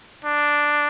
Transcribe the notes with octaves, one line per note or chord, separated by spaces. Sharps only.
D4